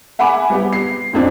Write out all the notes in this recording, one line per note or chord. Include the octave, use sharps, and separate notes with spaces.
E5 F#5 G#5 B5 D6
G3 B3 G4
C7
A1 F2 D4 C5